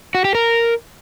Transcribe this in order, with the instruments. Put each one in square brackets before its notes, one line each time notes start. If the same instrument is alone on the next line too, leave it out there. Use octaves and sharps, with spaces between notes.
[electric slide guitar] F#4
G4
A#4